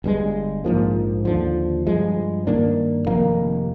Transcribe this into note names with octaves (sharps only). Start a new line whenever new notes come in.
G1 G2 D3 G#3
A#1 G#2 F3 A#3
D#2 D3 F3
G2 F3 G#3
G2 D#3 A#3 D4
F1 F2 D#3 A#3